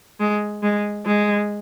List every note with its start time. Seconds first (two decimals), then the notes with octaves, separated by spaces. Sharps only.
0.20 G#3
0.63 G#3
1.06 G#3